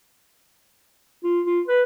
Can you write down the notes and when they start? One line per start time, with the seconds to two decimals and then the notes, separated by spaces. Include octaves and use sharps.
1.24 F4
1.46 F4
1.68 B4